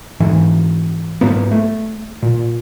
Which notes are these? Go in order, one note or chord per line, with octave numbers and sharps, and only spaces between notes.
G#2 E3
G#2 F#3 A#3 B3
A3
A#2